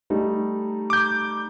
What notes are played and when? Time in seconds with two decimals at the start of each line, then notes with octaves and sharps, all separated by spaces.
0.10 G3 A3 D#4
0.90 D6 G6